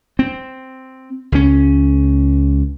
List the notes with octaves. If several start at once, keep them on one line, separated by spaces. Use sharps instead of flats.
C4
C#2 C#4